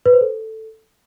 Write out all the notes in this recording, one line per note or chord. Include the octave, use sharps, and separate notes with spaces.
B4
C5
A4